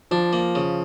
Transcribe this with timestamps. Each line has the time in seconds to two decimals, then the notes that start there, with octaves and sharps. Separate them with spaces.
0.11 F3 D4
0.33 A#3
0.55 C#3